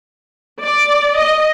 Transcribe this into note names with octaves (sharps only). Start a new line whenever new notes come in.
D5
D#5